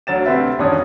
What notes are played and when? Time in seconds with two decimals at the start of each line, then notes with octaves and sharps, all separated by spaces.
0.07 D2 F#3 A6 E7
0.26 D2 C3 C4 B4 E5
0.59 E1 F#2 D#3 D4 C#5 D#6